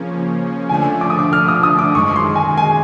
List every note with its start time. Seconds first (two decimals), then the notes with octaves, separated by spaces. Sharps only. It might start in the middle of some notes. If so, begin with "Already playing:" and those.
Already playing: C#3 F3 A#3 C#4
0.69 D3 F3 A3 D4 G#5
1.01 D6
1.10 D#6
1.19 D6
1.33 F6
1.48 D#6
1.63 D#6
1.79 D6
1.94 F#2 D#3 G#3 C#6
2.16 C6
2.35 G#5
2.57 G#5